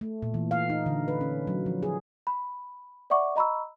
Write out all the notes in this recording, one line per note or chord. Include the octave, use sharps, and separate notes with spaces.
A3
A#2
E3
F5
D#4
D3
B4
C#4
F#3
F3
G#4
B5
D5 E5 F#5 C#6 D6
D#5 A#5 B5 C#6 E6